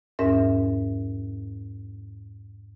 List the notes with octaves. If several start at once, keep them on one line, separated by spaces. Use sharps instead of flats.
E2 G#2 C#4 A#4 E5